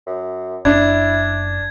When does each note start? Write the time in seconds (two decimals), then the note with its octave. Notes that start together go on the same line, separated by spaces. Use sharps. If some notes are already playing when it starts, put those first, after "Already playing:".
0.07 F#2
0.65 F#1 D4 E4 G#6